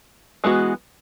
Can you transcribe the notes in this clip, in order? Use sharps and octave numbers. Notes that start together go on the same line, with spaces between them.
E3 G#3 B3 F#4